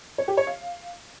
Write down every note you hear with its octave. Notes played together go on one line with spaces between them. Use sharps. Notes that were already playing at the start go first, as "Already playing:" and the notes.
C#5
G4
C#5
F5